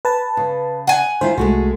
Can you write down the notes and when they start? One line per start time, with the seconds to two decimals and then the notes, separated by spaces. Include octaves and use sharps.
0.05 B4 A5
0.37 C#3
0.87 F#5 G#5
1.21 D#3 E4 F4 C5
1.38 C2 G#3 A3 F#4